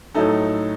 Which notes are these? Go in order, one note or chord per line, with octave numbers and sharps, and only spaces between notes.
A2 F#3 A3 D#4 A4